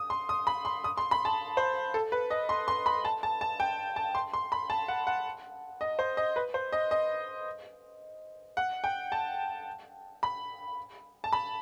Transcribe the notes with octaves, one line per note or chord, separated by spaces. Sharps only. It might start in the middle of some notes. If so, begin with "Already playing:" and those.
Already playing: D#6
C6
D#6
B5
C6
D#6
C6
B5
A5
C5
A4
B4
D#5
C6
C6
B5
A5
A5
A5
G5
A5
C6
C6
B5
A5
F#5
F#5
D#5
C5
D#5
B4
C5
D#5
D#5
F#5
G5
A5
B5
A5
B5